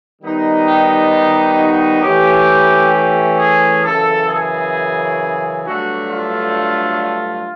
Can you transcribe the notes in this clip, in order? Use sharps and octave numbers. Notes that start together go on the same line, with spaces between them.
D#3 G3 B3 D#4
G4
F#4
E3 A3 C#4 G4
G4
G#4
F#2 C#3 E3 A4
G#4
G2 D3 F#3 A3 D4 F#4
F4